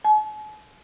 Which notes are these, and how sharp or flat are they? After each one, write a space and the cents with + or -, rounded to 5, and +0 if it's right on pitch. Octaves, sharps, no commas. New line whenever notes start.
G#5 +45